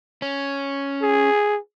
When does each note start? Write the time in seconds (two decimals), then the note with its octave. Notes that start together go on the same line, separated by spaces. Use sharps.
0.22 C#4
1.02 G#4